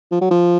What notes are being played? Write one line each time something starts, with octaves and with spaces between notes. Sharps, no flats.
F3
F#3
F3